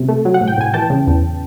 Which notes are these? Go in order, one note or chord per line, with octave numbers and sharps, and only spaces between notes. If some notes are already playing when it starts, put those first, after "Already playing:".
Already playing: C3
A3
F#3
F#5
A2
G5
A2 G#5
E3 G5 A5
C#3
E2